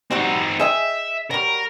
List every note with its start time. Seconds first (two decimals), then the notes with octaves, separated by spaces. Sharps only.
0.11 G3 C4 D#4 F#4 F#5
0.60 G#4 D#5 E5 G5
1.31 F#3 G3 A#4